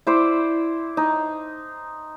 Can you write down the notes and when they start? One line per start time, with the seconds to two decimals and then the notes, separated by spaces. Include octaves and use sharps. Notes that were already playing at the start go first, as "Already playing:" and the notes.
0.07 E4 C5 D5
0.97 D#4